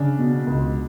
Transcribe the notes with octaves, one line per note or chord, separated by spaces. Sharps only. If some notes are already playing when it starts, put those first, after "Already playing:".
Already playing: C#3 D4
B2
C#2